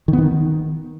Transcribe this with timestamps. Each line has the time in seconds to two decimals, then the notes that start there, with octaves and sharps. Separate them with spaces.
0.08 D#3
0.13 B3
0.18 D#3